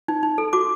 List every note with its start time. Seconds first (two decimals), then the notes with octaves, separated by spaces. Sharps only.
0.08 D#4
0.23 D#4
0.38 A4
0.53 F#4 D6